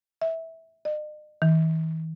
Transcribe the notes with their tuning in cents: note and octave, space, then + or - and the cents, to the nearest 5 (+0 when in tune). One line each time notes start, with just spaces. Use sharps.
E5 -15
D#5 -45
E3 -45